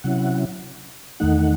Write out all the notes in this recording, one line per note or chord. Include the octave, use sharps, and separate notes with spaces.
C3 F#3 C#4 E4 F#5
E2 D#3 A3 D#4 F#5